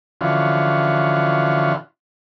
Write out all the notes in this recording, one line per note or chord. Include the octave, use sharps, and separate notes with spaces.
D3 E3 F3 C#4 F4 F#4